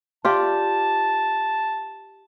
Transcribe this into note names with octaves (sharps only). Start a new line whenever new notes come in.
F4 G4 D5 A5